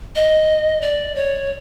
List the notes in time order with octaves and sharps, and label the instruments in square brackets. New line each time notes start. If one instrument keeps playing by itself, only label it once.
[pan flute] D#5
D5
C#5